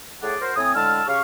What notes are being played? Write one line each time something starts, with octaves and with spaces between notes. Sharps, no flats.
A2 G#4 D5 F#5
F#4 A#4 C5
A2 C4 G#5 D#6
A2 D3 G#3 A5 E6 F6
C#3 G4 F5 C#6